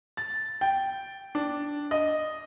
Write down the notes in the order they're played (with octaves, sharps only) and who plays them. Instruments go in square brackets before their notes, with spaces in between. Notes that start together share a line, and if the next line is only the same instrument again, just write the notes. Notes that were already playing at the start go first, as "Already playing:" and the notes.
[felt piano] A6
G5
D4
D#5